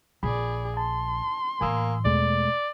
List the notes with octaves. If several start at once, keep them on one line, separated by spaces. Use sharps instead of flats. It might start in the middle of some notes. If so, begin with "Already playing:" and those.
A#1 G#4 D5 B5
A5 C6
A2 E3 A#3 G#5 D#6 E6
E2 B2 G#3 A3 D5